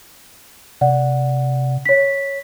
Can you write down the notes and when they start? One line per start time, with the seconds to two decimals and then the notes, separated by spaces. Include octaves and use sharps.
0.81 C3 D5 F#5
1.85 C#5 B6